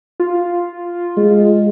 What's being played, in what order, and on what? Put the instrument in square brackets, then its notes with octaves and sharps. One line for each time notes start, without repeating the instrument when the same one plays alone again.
[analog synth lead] F4
[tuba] G#3